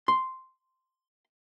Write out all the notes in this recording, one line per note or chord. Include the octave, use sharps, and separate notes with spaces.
C6